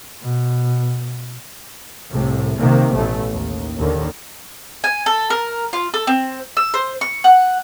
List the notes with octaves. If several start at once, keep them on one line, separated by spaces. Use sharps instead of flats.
B2
C2 A2 C3
C3 D#3 A#3
A1 B2 A3
D#2
D#2 D3 D#3
G#5
A4
A#4
F4
A4
C4
E6
C5
C#6
F#5